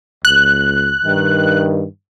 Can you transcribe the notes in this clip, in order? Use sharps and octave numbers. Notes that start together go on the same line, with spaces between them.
C#2 F#6
G2 D#3